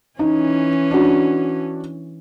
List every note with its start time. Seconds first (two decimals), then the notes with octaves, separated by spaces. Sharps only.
0.19 E3 C#4 D#4
0.91 D4 F#4